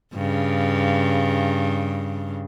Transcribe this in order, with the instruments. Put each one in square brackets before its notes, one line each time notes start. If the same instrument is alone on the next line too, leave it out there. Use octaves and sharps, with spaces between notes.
[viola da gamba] G2 C#3